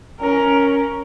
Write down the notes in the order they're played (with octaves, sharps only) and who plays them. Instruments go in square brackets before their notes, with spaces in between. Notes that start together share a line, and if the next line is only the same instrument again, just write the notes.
[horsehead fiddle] C#4 A#4